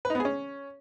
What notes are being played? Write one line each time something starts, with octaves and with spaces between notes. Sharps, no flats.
B4
D#4
B3
G#4
C#4